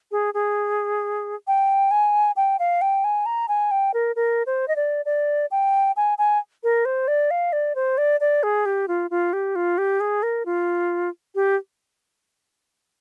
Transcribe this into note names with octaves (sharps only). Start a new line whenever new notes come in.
G#4
G#4
G5
G#5
G5
F5
G5
G#5
A#5
G#5
G5
A#4
A#4
C5
D#5
D5
D5
G5
G#5
G#5
A#4
C5
D5
F5
D5
C5
D5
D5
G#4
G4
F4
F4
G4
F4
G4
G#4
A#4
F4
G4